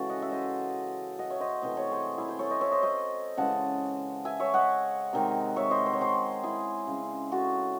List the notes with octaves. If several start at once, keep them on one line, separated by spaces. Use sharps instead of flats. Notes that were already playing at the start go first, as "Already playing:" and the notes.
Already playing: C#3 E3 G#3 F#4 A4
D#5 F#5
E5
C5 D#5
D#5 F#5
C#5 E5
C5 D#5
C3 E3 A3 C5 D#5
A4 C#5
G#4 C5
E4 G#4
G#4 C5
A4 C#5
C5 D#5
C#5 E5
C5 D#5
C5 D#5
C#3 E3 G#3 F#5 A5
E5 G#5
C#5 E5
D#5 F#5
C3 D#3 G#3
C#5 E5
C5 D#5
C5
C#5
G#4 C5
E4 G#4
C#3 G#3
F#4 A4